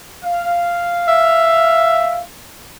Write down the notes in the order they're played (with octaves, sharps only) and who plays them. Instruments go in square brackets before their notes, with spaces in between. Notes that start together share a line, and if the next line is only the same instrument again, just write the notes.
[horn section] F5
[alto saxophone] E5